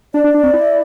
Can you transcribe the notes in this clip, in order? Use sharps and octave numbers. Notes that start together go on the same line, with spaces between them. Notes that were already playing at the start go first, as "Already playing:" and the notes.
D4 D5
D4
D4
C4
E4